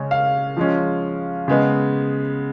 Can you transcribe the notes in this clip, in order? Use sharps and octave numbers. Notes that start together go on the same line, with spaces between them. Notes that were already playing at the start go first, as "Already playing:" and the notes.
Already playing: C#3 G#3 C#4
F5
F3 G#3 C#4
C#3 G#3 B3